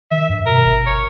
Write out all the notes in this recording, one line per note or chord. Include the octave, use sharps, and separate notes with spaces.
D#3 E5
G2
B2 A#4
G1
C#5